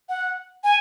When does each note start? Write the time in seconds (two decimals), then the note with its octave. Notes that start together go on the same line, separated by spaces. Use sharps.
0.09 F#5
0.64 G#5